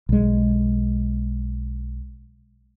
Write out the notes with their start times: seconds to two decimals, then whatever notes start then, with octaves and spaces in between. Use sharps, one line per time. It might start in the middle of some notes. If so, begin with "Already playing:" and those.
0.09 B1 G#3